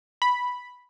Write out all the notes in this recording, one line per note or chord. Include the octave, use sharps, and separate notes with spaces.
B5